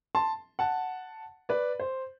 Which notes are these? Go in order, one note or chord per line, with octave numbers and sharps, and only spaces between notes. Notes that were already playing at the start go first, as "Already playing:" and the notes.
A5 C6
F#5 A5
B4 D5
C5